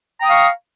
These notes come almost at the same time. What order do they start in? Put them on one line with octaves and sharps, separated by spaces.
A#5 G5 D#6 F5 C#6